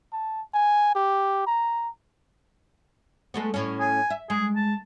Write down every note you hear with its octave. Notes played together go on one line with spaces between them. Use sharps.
A5
G#5
G4
A#5
G#3 A3 B3
A2 C#4
G#5
E5
G#3 G#4
A5